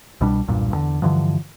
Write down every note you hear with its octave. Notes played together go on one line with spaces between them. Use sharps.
C2 B2 G3 D4
B1 E2 G2 A#2
E2 D3
G2 D3 E3 F3